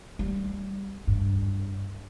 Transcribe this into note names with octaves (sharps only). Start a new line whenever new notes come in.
G3
G2